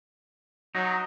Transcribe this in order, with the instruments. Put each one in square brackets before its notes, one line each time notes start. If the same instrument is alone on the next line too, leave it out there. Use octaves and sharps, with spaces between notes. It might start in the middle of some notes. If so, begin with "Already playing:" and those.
[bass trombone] F#3 [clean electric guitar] D#4